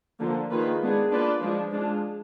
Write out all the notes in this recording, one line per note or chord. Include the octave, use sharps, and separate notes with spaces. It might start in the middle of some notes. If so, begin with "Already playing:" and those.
D3 F3 A#3
D#3 A#3 F4 G#4 B4
G#3 B3 D4 G#4
A#3 D4 F4 B4 D5
F3 G#3 D4
G#3 D4 F4